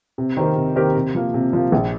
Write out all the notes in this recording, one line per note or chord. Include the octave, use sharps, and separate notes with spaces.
C3
D#3 C4 G4 A#4
C3
D#3 C4 G4 A#4
C3
F3 A#3
C3
F3 A#3
A#1